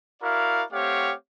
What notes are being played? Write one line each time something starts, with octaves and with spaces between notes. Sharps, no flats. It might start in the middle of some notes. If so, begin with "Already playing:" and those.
E4 F#4 A#4 D5 F5
A3 C4 G4 C#5 F5 F#5